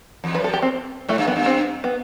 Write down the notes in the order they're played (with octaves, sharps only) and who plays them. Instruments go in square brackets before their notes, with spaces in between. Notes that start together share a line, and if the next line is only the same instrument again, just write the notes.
[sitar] E2
[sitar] F#2 [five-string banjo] B4
[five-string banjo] A4
G4
C4
[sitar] A2 [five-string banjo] A3
[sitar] G2
[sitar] F#2 [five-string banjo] B3
[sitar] G2
[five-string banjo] C4
B3